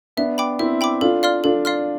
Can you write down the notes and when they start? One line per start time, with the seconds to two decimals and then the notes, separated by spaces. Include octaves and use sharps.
0.17 B3 D4 E5
0.38 G5 B5 D6
0.59 C4 E4 E5
0.81 G5 B5 D6
1.01 D4 F4 A4
1.23 D5 F5 C6 F6
1.44 D4 F4 A4
1.65 D5 F5 C6 F6